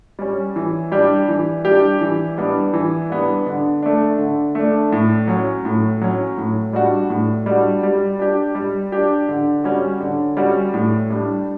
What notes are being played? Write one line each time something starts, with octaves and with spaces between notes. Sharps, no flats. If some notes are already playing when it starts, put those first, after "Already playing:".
G3 C#4
E3
G3 D4 G4
E3
G3 D4 G4
E3
G3 B3 D4
E3
G3 B3 D4
D3
A3 D4
D3
A3 D4
A2
F#3 C#4
A2
F#3 C#4
A2
G3 D4 F#4
A2
G3 D4 F#4
G3
D4 G4
G3
D4 G4
D3
G3 C#4 F#4
D3
G3 C#4 F#4
A2
G3 D4